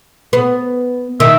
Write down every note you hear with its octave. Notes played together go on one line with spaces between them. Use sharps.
B3
D#3 E5